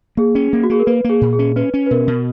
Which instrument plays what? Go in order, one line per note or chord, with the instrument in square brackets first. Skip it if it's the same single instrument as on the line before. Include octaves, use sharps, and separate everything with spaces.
[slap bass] A#3 [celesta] G#4
[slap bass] C#4
A#3
[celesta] F#4
[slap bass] A#3 [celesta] G#4
[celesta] A#4
[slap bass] A#3 [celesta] B4
[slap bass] A#3 [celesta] G#4
[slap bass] A#2
[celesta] G#4
[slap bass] C#4
[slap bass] C#4 [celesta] B4
[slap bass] C#4
[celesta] B4
[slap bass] B2 [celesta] A#4
[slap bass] B2